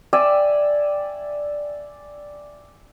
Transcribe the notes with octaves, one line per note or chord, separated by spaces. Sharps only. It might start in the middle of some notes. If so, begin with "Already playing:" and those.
D5 E5 G5 G#5